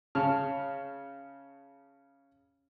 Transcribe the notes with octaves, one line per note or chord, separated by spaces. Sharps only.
C#3 C#4 A5 F6